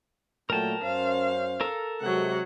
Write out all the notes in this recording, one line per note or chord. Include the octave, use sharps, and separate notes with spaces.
A#2 F#3 A3 A#4 G5 A5
F#2 C#4 C5 F5
A4 A#4
C3 F#3 G#3 F#5